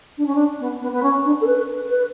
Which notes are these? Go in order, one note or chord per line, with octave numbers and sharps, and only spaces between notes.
D4
C#4
D4
B3
B3
B3
C#4
D4
A4
B4
B4